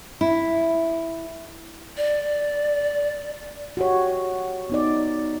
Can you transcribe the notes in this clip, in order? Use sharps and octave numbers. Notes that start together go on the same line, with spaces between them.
E4
D5
F#4 G4 C#5
B3 D#4 D5